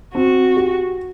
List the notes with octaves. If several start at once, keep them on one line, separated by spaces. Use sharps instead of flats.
C4 F#4
G4